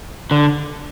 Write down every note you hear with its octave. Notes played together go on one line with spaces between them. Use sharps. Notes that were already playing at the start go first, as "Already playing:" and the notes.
D3